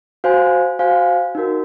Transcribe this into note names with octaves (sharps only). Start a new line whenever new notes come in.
F#4 C5 F5 G#5
F#4 C5 F5 G#5
D#4 F#4 A#4